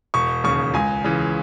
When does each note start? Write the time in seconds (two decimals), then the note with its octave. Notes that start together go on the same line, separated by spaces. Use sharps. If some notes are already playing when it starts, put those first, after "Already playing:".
0.14 E1 C#6
0.44 D#2 C#3 C#6
0.74 C#2 G#5
1.04 C#3 E3